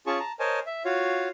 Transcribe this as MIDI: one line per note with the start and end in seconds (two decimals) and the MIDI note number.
0.07 0.19 61
0.07 0.19 65
0.07 0.19 68
0.07 0.19 81
0.07 0.19 85
0.19 0.32 81
0.19 0.32 82
0.40 0.59 70
0.40 0.59 72
0.40 0.59 73
0.40 0.59 75
0.40 0.59 80
0.40 0.59 81
0.66 0.83 76
0.85 1.28 65
0.85 1.28 66
0.85 1.28 73
0.85 1.28 77